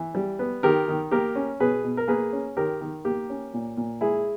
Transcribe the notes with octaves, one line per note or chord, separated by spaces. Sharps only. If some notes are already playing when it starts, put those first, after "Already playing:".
Already playing: E3
G3
B3
D#3 G4 A#4
D#3
A#3 G4 A#4
C#4
B2 G#4 B4
B2
A#4
A#3 G#4 B4
C#4
D#3 G4 A#4
D#3
A#3 G4
C#4
A#2
A#2
G#3 E4 G#4